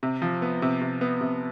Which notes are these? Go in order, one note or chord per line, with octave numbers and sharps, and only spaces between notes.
C3
F3
B3
C3
C3
B3
C3